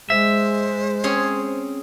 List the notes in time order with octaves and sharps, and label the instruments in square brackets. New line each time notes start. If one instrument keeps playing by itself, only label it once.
[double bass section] G#3 [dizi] C5 [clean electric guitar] E5
[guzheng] C4 C#4 G#4